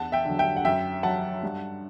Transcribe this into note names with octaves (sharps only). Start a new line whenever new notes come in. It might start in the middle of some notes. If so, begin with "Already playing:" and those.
Already playing: E2 F#5 A5
E5 G5
D3 F#3
E5 G5
F#5
F#2 E5 G5
F#3 F#5 A5
G2